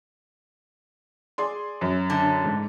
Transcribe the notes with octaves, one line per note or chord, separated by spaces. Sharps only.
G#4 D5 C6
F#2
D3
G#2